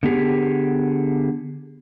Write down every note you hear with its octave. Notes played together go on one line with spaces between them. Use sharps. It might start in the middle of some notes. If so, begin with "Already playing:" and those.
D3 B3 G4 G#4